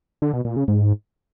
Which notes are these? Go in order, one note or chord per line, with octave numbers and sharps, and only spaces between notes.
D3
B2
A#2
C#3
G#2